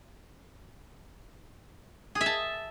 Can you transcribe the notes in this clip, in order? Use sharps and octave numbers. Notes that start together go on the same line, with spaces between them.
G#4
E5
A5